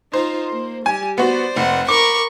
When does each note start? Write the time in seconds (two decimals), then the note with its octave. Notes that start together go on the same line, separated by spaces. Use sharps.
0.13 D#4 F4 C5
0.51 A#3
0.86 G3 G4 G#5
1.18 B3 F#4 C5 D5
1.56 F1 F#5
1.88 A#4 B5 C#6 D6